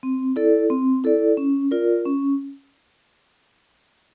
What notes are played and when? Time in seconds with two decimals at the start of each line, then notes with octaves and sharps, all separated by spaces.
0.03 C4
0.36 E4 A4 D5
0.70 C4
1.04 E4 A4 D5
1.37 C#4
1.71 F4 A#4 D5
2.05 C#4